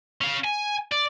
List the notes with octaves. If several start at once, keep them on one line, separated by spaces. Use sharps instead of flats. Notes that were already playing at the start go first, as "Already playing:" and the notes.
C#4 F5
G#5
D5